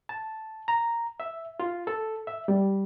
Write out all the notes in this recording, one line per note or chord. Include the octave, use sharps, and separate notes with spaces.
A5
A#5
E5
F4
A4
E5
G3